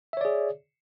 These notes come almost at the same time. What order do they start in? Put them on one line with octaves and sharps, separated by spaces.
E5 C#5 D5 G#4